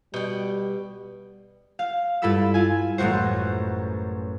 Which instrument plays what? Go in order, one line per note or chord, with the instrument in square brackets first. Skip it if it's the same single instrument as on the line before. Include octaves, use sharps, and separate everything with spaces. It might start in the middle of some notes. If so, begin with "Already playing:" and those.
[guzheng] B2 G5 [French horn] G3
[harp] F5
G2 E4 F4 A4 B5 E6
F4 G#5
A1 F#2 A2 F#4 C5